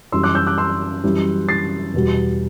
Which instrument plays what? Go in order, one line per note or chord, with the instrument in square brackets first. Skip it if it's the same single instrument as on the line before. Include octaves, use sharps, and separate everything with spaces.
[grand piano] F#2 E3 G3 C6 E6
D6 F#6
E6 G6
D6 F#6
C6 E6
F#2 E3 G3
A6 C7
E2 B2 G3